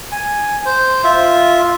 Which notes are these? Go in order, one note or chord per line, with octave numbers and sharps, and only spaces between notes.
G#5
C5
F4 E5